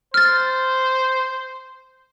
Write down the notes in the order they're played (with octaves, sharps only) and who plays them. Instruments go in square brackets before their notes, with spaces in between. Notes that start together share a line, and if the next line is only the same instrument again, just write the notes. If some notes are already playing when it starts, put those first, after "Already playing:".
[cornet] C5 [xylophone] F6 A6